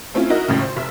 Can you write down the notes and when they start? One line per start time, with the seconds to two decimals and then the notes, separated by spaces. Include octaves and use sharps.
0.14 A3 C4 C#4 E4 F4
0.29 D#4 E4 F#4 A#4 D#5
0.48 G#1 F2 A2 C#3
0.61 C5
0.76 F1 E5